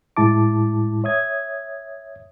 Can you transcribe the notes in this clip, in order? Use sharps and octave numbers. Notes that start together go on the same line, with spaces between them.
A2 G#3 E4 A5 D6
C#5 E5 D#6 G#6